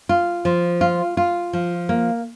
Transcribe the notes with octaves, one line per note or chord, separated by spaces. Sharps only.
F4
F3
F4
F4
F3
A#3